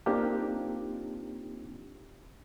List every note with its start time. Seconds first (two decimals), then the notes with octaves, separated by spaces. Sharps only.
0.06 A#3 C4 D4 D#4 F4 G4